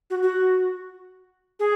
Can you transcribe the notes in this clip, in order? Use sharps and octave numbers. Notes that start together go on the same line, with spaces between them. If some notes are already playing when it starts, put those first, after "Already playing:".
F#4
F#4
G#4